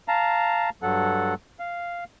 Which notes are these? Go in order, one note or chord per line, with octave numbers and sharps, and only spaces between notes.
F5 A5 A#5
G2 F#3 A4 F#5
F5